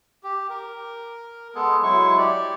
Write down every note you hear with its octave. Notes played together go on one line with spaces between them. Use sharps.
G4
A#4
G#3 B3 G#4 A4
F#3 G#3 E4 C#6
G4 D5